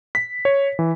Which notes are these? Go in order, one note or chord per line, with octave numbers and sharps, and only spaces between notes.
B6
C#5
E3